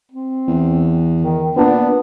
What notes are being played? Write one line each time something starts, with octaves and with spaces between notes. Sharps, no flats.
C4
E2
D#3
A#2 B3 D4